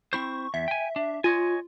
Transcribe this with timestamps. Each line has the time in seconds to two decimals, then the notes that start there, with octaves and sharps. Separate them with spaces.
0.13 C4 E4 C5 C#6
0.54 E2 E5
0.68 G5 G#5
0.96 D4
1.24 F4 C#5 D#5 G#5